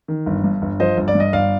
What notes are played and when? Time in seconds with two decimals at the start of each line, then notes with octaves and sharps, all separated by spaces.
0.08 D#3
0.26 G1
0.44 G2
0.62 G1
0.80 F3 C5 D#5
0.97 G1
1.08 D5
1.15 G2
1.20 D#5
1.33 G1 D5 F5